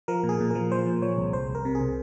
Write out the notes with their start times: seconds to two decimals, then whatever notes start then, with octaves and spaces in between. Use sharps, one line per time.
0.08 F3 A#4
0.24 A#2
0.29 G#4
0.40 A#2
0.51 F3 A#4
0.72 F3 C5
0.86 A#2
1.02 F3 C#5
1.17 C2
1.33 C2 C5
1.48 C2
1.55 A#4
1.65 C3
1.75 G#4
1.81 C3